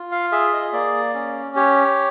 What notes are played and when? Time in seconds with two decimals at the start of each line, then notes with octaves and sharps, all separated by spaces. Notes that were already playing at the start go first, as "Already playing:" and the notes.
Already playing: F4
0.12 F5
0.32 G#4 E5
0.53 D#5
0.73 A#3 D5
1.14 C#4
1.56 G4 C#5